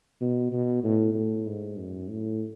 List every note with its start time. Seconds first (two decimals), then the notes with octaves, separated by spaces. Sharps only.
0.21 B2
0.52 B2
0.84 A2
1.15 A2
1.47 G#2
1.77 F#2
2.09 A2